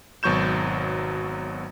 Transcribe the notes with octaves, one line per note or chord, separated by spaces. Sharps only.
G#1 B2 F#3 C#6 G6 E7